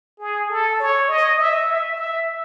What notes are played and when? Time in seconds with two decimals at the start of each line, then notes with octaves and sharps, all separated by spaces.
0.19 G#4
0.49 A4
0.80 C#5
1.08 D#5
1.39 E5
1.68 E5
1.97 E5